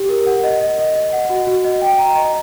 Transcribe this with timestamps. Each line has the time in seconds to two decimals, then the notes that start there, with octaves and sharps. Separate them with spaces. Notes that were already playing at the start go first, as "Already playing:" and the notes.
Already playing: G4
0.09 A#4
0.26 F#5
0.44 D#5
0.61 D#5
0.78 D#5
0.95 D#5
1.13 F#5
1.30 F#4
1.47 F#4
1.64 D#5
1.82 G5
1.98 A#5
2.16 D#5